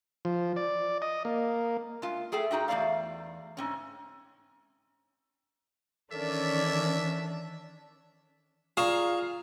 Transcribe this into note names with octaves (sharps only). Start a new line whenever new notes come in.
F3
D5
D#5
A#3
G#3 F4
A3 G#4 A4 G5
G#2 D#4 F#4 G5
E2 G#2 A3 D5 F5
G#2 C4 C#4
D#3 E3 C#4 D4 A4 A#4 D5 E5
F4 G#4 D5 F5 A#5 C#6 E7